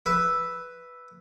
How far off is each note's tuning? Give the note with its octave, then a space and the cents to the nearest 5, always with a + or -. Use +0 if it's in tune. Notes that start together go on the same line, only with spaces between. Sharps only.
B4 +0 E5 +0